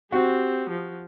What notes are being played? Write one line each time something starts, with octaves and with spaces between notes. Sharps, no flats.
C4 F#4 G4
F3